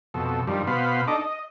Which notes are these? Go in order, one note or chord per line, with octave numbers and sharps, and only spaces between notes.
F2 B2 A4
G2 D#3 F3 G3
B2 B3 C5 F5 B5
D4 D#4 A4 D#5 D6
D#5